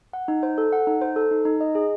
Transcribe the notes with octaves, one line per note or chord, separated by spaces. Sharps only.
F#5
D#4
C5
A4
F#5
D#4
C5
A4
D#4
D#4
D#5
G#4